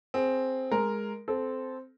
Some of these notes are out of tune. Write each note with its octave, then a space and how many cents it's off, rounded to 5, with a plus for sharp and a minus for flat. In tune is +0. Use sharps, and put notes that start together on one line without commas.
C4 +0 G#4 +15
G#3 +0 A#4 +0
C4 -10 A4 -20